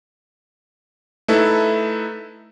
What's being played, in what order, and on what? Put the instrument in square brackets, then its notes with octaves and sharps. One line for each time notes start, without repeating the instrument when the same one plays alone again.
[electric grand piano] A3 D#4 E4 A4 B4